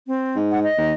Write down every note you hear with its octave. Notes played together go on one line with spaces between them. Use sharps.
C4
G#2
F#5
D#5
D#2